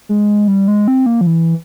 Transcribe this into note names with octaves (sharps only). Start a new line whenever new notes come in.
G#3
G3
G#3
C4
A#3
F3
E3